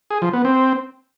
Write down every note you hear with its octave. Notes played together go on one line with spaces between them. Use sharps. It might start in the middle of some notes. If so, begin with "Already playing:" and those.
G#4
F3
B3
C4